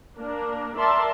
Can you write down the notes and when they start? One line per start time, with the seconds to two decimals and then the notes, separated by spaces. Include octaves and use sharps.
0.17 A#3 D4 A#4
0.77 A#4 D5 E5 A5 C6